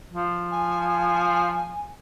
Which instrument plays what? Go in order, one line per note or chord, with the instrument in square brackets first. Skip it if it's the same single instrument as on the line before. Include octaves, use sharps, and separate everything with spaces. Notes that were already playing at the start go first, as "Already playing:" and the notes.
[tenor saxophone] F3
[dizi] G#5